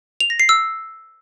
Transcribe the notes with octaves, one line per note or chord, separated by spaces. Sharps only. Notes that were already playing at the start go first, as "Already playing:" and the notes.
F7
A#6
C7
E6